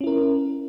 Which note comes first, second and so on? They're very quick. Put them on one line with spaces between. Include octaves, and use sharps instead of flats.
C#4 E4 A#4